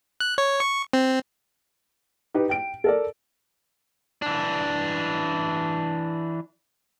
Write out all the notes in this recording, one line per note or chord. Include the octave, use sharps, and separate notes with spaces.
F#6
C#5
C#6
C4
D#4 G4 B4
G5 D7
A4 A#4 D5
E3 D4